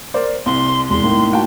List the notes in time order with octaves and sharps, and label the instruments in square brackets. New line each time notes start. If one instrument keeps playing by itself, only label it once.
[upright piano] A#4 C5 D5
[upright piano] C2 [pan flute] C6
[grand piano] E1 [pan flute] C6
[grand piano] A2 A#3 D#4
[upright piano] F#4 G5 A5